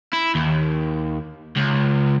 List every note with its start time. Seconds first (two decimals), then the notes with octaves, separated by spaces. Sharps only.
0.13 E4
0.35 D#2
1.56 C#2